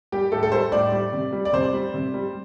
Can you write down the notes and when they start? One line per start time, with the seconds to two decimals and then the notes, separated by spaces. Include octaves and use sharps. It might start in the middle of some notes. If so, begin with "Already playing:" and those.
0.12 G3 G4
0.32 A2 A4
0.43 A4
0.52 G3 C5
0.72 A2 D5
0.92 G3
1.13 C3
1.33 G3
1.45 D5
1.53 C3 C5
1.74 G3
1.94 C3
2.14 G3